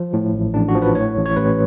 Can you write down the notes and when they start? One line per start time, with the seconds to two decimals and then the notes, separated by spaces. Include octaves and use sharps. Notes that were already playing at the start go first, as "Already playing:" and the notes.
Already playing: F3
0.13 A2
0.33 A1
0.54 A1 D4
0.68 F#4
0.75 F3
0.82 B4
0.95 A2 C#5
1.17 A1
1.26 C#5
1.36 A1 B4